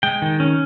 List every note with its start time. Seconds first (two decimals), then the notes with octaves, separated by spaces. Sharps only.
0.03 G#3 G5
0.22 D#3
0.40 C#4